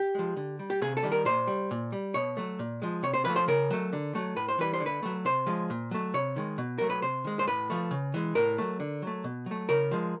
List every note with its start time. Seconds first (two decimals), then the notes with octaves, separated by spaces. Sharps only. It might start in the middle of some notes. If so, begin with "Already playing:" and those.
Already playing: G4
0.15 F3 G#3
0.37 D3
0.59 G3
0.70 G4
0.82 C3 G#4
0.97 A4
1.03 D#3 G3
1.12 A#4
1.25 A#2 C5
1.47 G3
1.71 A#2
1.92 G3
2.14 B2 C#5
2.37 F#3 A3
2.59 A#2
2.82 F3 G#3
3.03 C3 C#5
3.14 C5
3.25 F3 A3 B4
3.36 C5
3.48 C#3 A#4
3.71 F#3 A3
3.93 D3
4.15 F#3 A3
4.36 A2 B4
4.48 C5
4.59 E3 G3 B4
4.74 C5
4.80 D3
4.86 B4
5.02 F#3 A3
5.25 C3 C5
5.46 F3 G#3
5.70 A#2
5.91 F#3 A3
6.14 C3 C#5
6.36 D#3 G#3
6.58 B2
6.78 F#3 A3 A#4
6.90 B4
7.02 C3 C5
7.24 D#3 G#3
7.39 C5
7.47 A2 B4
7.70 F3 A3
7.91 C#3
8.14 E3 G#3
8.35 A2 A#4
8.58 F#3 A3
8.80 D3
9.02 F#3 A3
9.24 B2
9.46 F#3 A3
9.69 C#3 A#4
9.91 F3 G#3